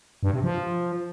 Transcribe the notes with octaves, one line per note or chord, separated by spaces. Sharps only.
G2
C3
F3